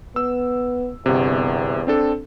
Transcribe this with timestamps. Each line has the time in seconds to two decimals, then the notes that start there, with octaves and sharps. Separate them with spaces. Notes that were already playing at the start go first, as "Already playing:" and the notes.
0.16 B3 E6
1.06 G1 E2 C3
1.87 C4 D4 A4